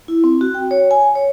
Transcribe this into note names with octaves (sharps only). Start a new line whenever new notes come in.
E4
C4
F#4
G5
C#5
G#5
C#5